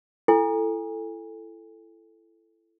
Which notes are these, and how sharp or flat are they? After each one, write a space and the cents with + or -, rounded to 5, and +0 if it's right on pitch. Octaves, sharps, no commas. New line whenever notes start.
E4 +25 A4 +0 G#5 -35